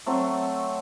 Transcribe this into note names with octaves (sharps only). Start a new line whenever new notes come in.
F#3 A3 C4